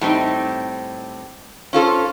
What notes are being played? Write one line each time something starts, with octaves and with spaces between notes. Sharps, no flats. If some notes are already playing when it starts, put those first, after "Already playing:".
A2 G3 C4 D#4
C#4 F4 A4 C5